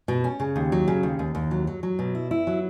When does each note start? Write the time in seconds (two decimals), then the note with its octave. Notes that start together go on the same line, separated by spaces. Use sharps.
0.08 B2
0.24 C#4
0.40 C#3
0.56 D#2
0.72 F#3
0.88 C#3
1.03 D#2
1.19 D#2
1.35 D#2
1.51 F#3
1.67 F#3
1.83 F#3
1.99 B2
2.15 E4
2.31 E4
2.47 F#3